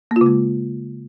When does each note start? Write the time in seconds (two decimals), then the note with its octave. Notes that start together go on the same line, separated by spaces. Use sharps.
0.11 A#3
0.16 F4
0.21 C#3
0.26 G#3